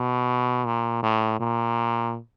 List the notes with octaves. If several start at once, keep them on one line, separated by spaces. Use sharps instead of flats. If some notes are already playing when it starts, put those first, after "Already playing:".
Already playing: B2
A#2
A2
A#2